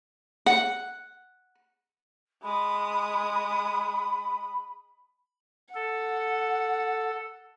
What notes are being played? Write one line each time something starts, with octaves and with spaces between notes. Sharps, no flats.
F#5
G#3 B5 D#6
A4 F#5